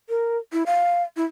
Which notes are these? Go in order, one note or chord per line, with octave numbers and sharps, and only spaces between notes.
A#4
E4
F5
E4